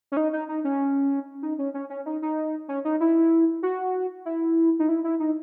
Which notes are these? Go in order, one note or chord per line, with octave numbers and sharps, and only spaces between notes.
C#4
D#4
D#4
D#4
C#4
D#4
C#4
C#4
C#4
D#4
D#4
C#4
D#4
E4
F#4
E4
D#4
E4
E4
D#4